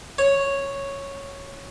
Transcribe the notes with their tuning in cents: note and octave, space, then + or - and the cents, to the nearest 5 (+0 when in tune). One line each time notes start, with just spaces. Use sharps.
C#5 -5